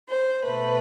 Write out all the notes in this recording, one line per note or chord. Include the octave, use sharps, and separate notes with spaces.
C5
B2 A3 B4